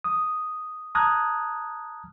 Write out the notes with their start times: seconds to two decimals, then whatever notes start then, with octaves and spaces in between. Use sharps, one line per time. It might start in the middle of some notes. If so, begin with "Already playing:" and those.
0.04 D#6
0.95 A5 A#5 D#6 F6 F#6 G#6